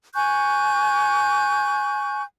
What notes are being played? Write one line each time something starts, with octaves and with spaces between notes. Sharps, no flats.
G#5 C#6 F#6 G6